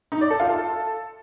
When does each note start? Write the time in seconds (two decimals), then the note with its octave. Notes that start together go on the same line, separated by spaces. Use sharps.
0.12 D#4
0.21 D5
0.30 A4
0.40 F4
0.49 A4